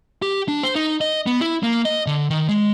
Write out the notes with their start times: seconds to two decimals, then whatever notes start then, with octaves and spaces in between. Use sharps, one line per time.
0.22 G4
0.48 D4
0.63 C5
0.75 D#4
1.01 D#5
1.26 B3
1.41 E4
1.63 A#3
1.85 D#5
2.06 D3
2.30 D#3
2.48 G#3